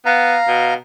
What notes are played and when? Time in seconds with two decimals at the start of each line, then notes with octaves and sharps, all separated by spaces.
0.06 B3 F5 A#5
0.48 B2